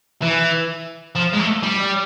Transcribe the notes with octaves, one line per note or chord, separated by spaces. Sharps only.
E3
F3
G#3
A3
G3